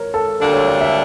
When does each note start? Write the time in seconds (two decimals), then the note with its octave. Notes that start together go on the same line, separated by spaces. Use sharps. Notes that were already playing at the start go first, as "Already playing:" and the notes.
Already playing: A#4 C#5
0.14 A4
0.40 D2 D3 G3 A#3 D4 A4
0.54 C#5
0.67 D5
0.81 E5